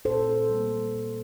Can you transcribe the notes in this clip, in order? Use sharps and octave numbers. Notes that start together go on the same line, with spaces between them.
A#2 A4 C5
G3 A#3
A#2